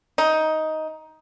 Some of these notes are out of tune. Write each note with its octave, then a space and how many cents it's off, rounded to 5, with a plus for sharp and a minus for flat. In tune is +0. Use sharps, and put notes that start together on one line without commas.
D#4 +10